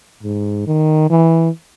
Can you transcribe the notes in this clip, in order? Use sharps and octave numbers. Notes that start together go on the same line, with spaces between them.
G#2
D#3
E3